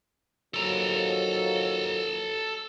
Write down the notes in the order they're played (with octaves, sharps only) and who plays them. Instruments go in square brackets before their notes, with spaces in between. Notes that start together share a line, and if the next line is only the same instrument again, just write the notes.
[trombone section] D#2 F3 F#3 [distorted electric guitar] A4 A#5